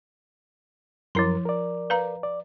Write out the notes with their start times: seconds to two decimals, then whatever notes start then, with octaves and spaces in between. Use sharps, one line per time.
1.15 F#2 F3 E4 A#4 C6
1.45 A#4 D5
1.90 B4 F5 A#5
2.23 D5